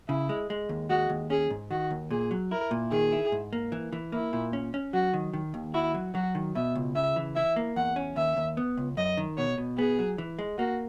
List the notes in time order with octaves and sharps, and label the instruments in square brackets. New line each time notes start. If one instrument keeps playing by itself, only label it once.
[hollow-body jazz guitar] C#3 [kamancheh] E4
[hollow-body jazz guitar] G#3
G#3
D#2
[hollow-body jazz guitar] G#3 [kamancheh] F#4
[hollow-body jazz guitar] D#2
[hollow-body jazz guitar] C#4 [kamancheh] G#4
[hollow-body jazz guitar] G#2
[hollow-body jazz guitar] D#3 [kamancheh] F#4
[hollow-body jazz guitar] D#2
[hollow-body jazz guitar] A#2 [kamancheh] G#4
[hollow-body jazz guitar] F#3
[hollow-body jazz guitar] E4 [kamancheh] A#4
[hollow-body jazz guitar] A#2
[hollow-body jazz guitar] D#3 [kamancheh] G#4
[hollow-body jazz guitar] E4
G#2
A#3
E3
E3
[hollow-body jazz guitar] A#3 [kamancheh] E4
[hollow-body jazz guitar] A#2
C#4
C#4
[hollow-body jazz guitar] F#3 [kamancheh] F#4
[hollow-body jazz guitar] D#3
D#3
D#2
[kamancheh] E4 [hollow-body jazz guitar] F#4
[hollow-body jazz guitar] F#3
[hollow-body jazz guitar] F#3 [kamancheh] F#4
[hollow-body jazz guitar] D#3
[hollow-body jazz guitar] B2 [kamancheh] E5
[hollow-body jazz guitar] C#2
[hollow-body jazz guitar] C#3 [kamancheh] E5
[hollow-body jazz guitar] E3
[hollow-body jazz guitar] E4 [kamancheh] E5
[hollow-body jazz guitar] A#3
[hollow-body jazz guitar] E2 [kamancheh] F#5
[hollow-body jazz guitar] C#4
[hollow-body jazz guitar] D#2 [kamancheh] E5
[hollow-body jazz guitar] D#2
B3
C#2
[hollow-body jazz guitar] F#2 [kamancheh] D#5
[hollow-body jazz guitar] D#3
[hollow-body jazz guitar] B2 [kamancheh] C#5
[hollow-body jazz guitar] B2
[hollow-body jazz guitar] B3 [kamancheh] G#4
[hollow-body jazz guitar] F#3
E3
G#3
[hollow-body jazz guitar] A#3 [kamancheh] F#4